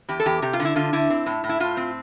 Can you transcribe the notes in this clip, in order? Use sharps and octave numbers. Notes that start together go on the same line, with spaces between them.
E2 G4
A4
E2 G4
C3 G4
F4
D3
E4
D3 F4
D3 E4
C4
A2
A2
E4
A2 F4
C4